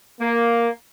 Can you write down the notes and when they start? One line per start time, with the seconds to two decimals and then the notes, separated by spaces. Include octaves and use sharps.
0.20 A#3